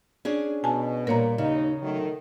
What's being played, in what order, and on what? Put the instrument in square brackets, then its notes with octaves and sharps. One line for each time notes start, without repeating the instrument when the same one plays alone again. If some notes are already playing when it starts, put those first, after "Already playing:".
[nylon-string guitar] C#4 D4 G#4
[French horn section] B2 [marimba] G#5 A5
[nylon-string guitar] A#2 G3 [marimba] A#4 C#5 A#5
[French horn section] D#2 D#4 [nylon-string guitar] C#3
[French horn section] D#3 F#3 A3